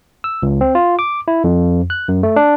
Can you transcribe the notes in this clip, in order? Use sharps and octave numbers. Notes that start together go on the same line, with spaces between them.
E6
C#2
C4
F4
D6
E4
F2
F#6
F#2
A3
D4